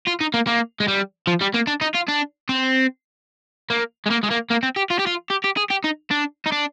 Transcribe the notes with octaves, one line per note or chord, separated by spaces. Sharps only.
F4
D#4
A#3
A#3
G#3
G3
F3
G3
A#3
D4
D#4
F4
D4
C4
A#3
G#3
A#3
G#3
A#3
A#3
C4
G4
F4
G4
F4
G4
G4
G#4
G4
D#4
D4
D#4
D4